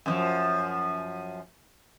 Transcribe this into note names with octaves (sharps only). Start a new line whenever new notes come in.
F#2 D#3 F3